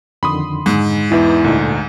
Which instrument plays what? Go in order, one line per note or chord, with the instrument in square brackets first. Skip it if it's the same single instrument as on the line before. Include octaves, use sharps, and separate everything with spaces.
[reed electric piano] F2 D3 D#3 [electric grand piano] B5 C6 D#6
[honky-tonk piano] G#2
[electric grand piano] E2 [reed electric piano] D#4 B4 D6 [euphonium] E4
[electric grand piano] D2 D#4 [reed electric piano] A#2 A4 D5